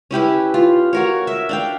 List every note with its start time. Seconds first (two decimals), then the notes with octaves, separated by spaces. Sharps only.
0.11 C#4 E4 G4 B4
0.54 F4
0.93 F#4 A#4 C#5
1.27 E5
1.49 D4 F5 G5